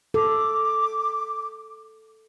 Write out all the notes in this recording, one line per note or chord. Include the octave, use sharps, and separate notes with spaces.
A4 D6